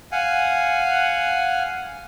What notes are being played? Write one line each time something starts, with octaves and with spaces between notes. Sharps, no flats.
F5 F#5 G#5